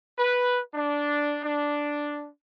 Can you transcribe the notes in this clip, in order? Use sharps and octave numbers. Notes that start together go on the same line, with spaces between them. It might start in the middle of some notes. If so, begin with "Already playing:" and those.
B4
D4
D4